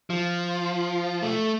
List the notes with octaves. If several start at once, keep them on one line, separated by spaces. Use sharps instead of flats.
F3
A3